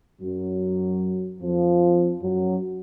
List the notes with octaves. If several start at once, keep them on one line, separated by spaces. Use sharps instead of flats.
F#2 F#3
F2 F3
F#2 F#3